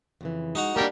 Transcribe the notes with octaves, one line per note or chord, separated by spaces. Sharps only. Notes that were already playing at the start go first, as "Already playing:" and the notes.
F2 C#3 E3
G#3 D#4 F#4 A#5
G3 A#3 D4 G4 A#4